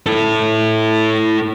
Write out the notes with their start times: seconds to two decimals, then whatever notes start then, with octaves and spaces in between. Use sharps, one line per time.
0.06 E4 A4